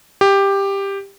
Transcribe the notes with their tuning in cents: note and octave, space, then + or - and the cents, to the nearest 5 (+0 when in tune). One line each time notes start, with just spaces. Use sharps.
G4 +10